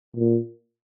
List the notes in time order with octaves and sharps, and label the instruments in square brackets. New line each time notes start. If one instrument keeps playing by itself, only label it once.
[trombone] A#2